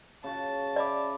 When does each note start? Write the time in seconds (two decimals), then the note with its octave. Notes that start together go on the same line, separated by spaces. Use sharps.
0.24 C#3 F#4 A5
0.76 D5 E5 B5 D6